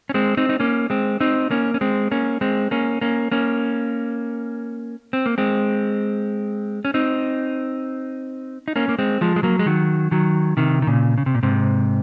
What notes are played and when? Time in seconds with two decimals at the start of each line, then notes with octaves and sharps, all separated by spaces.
0.09 C#4
0.14 G#3 C4
0.37 C4 D#4
0.49 D#4
0.60 A#3 C#4
0.90 G#3 C4
1.20 C4 D#4
1.51 A#3 C#4
1.74 C#4
1.81 G#3 C4
2.11 A#3 C#4
2.41 G#3 C4
2.71 A#3 C#4
3.01 A#3 C#4
3.32 A#3 C#4
5.13 C4
5.26 A#3
5.38 G#3 C4
6.85 C#4
6.94 C4 D#4
8.68 D#4
8.76 A#3 C#4
8.89 A#3
8.99 G#3 C4
9.21 F3 G#3
9.36 G#3
9.43 F#3 A#3
9.59 G#3
9.66 D#3 F#3
10.11 D#3 F#3
10.57 C3 D#3
10.82 D#3
10.87 A#2 C#3
11.18 C#3
11.26 C3
11.35 A#2
11.43 G#2 C3